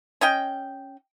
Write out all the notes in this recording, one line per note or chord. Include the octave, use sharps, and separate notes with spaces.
C#4 D#5 G5